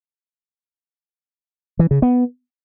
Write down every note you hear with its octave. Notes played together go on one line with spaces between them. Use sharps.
E3
C#3
B3